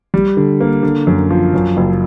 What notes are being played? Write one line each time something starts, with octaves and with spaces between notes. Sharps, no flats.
G3
D3
A#3
D3
F#2
F3
F#2
F#1